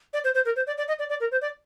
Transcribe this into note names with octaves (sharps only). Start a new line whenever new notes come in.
D5
C5
C5
A#4
C5
D5
D5
D#5
D5
D5
A#4
C5
D5